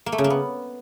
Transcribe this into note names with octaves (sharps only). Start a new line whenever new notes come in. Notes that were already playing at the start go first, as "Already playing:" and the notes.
A#3
A3
C#3
A#3
B3